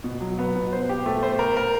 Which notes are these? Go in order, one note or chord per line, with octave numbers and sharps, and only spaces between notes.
B2
F#3
B3
B2
C5
G4
A3
C5
A#4
A#4